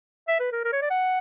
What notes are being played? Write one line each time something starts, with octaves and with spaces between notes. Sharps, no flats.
E5
B4
A#4
A#4
C#5
D5
F#5